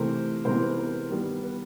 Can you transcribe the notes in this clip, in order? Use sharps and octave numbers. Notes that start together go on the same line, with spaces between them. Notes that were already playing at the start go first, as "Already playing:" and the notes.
Already playing: C3 E3 A3 A#4 C5
C3 E3 G#3 B3 A#4 C5
B4
A#4
B4
D#3 G3 B3 A#4
B4